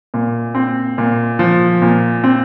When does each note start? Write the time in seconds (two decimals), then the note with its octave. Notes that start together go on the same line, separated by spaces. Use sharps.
0.14 A#2
0.55 C4
0.98 A#2
1.39 F3
1.82 A#2
2.24 C4